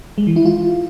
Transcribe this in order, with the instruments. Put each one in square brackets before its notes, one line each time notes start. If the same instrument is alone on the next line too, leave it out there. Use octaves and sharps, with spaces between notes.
[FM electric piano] G#3
E3
E4
F4